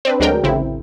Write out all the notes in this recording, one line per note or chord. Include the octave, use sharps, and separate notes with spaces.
C4 D4 B4
D2 F#3 G#3 D4 A#4 G5
A1 C#3 C4 E4